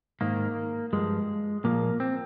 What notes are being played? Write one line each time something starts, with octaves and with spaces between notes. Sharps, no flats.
G#2 D#3 A#3
G2 F3 G#3
A#2 F3 A#3
C4